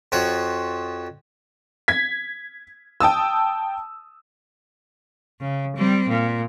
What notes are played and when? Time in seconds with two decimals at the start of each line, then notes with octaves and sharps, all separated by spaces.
0.12 F2 F3 F#4 C#5
1.88 G#6 B6
3.00 G5 A5 D#6 E6
5.41 C#3
5.76 G3 C4
6.09 A#2